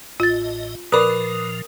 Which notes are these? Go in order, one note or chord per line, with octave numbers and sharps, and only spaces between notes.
A1 A2 F4 D#5 A6
A#2 F3 A#4 B4 D5 D#6